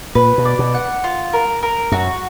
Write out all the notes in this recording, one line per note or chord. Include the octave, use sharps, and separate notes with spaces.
A#2 B4
B2
D5
B2
F#5
F4
A#4
A#4
F#2 F#4